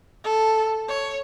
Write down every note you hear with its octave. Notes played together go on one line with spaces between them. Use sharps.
A4
C#5